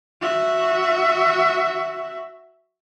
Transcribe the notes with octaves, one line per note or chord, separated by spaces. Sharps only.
F#4 E5